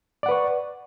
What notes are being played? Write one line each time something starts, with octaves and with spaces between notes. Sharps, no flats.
B4 D5 F#5 C#6